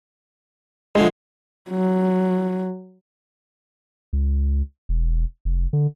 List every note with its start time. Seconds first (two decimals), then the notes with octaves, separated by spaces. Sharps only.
0.95 A2 D3 F3 G#3
1.71 F#3
4.13 C#2
4.89 E1
5.45 F1
5.73 D3